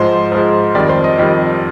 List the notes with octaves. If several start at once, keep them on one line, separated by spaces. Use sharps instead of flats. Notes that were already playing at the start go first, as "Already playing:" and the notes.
Already playing: G#2 F3 G#3 C5
G#2 F3 G#3
F2 D#3 G3 D5
C5
D#5
F2 D#3 G3